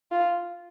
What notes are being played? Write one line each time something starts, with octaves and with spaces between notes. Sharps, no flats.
F4